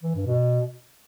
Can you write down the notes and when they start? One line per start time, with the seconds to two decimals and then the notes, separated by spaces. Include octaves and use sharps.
0.03 E3
0.15 G2
0.27 B2